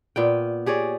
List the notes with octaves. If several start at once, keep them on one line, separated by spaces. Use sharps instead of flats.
A#2 B3 G5
G4 G#4 C#5 D5